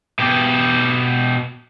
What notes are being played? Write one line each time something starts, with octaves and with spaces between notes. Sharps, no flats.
B2 G4